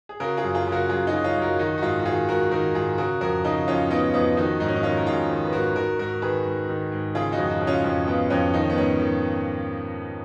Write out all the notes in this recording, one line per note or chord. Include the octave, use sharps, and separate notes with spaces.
G#4
C#3 F#4 A#4
F4 G#4
F#2
F4 G#4
C#3
F#4 A#4
F#2 F4 G#4
D#4 F#4
C#3
C#4 F4
F#2
F#4 A#4
D#3 D#4 F#4
F#4
G#2 F4 G#4
F#4
D#3 F4 G#4
G#2 F#4 A#4
D#3 F#4 A#4
G#2 F4 G#4
C#3 F#4 A#4
F2 F#4 A#4
C#3 D#4 F#4
F2 C#4 F4
C#3 B3 D#4
F2 B3 D#4
D#3 D#4 F#4
G#2 D#4 F#4
C#4
D#4
D#3 C#4 F4
A#4
G#2 F4 G#4
D#3
B4
G#2 F#4 A#4
D#3 F#4 A#4
G#2 F#4 A#4
D#3 G#4 B4
G#2
D#3
G#2
C#3 F4 G#4
D#4 F#4
F2
D#4 F#4
C#3
C#4 F4
F2 C#4
C#3 B3
F2 C#4
D#3 D#4
C#4
B3
G#2 C#4
D#3